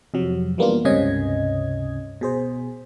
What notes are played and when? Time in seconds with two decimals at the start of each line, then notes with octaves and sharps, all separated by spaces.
0.14 F2 C3 F#3
0.58 E3 G3 A#3 B3 D4 F4
0.85 C#2 G2 C3 C#4 D#5 G#6
2.21 B2 G#4 C5